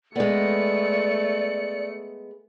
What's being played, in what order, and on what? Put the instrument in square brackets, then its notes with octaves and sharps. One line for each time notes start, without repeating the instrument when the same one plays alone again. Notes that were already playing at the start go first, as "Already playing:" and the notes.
[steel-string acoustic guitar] G#3 B3 [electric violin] A3 C#7 [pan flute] D5